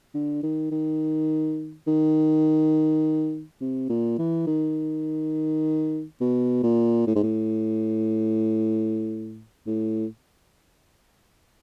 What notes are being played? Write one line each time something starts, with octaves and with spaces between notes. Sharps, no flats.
D3
D#3
D#3
D#3
C3
A#2
E3
D#3
B2
A#2
A2
G#2
A2
A2